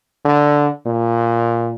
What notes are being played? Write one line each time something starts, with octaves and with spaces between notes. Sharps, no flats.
D3
A#2